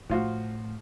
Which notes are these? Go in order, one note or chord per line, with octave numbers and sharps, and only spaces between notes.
A2 F3 F4 F#4